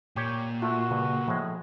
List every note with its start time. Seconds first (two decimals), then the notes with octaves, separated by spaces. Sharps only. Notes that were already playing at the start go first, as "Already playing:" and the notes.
0.16 A#2 G4 C#5
0.62 A3 F4 F#4
0.91 G2 C#3
1.28 A2 F3 G#3